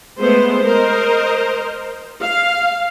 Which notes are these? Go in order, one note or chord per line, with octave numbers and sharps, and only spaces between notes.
G#3 A3 B3 C5
A#4 C5 D#5
F5